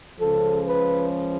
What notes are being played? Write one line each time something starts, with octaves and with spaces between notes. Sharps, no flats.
C#2 C#3 F3 A4
B4